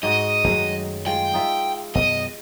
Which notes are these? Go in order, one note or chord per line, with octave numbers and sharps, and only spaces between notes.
G#2 F#4 D#5 F#5
F#2 D#3 F#3 G#3 A3 D#4
G#3 F4 G5
D#4 F4 E5
F#2 B2 D#3 D#5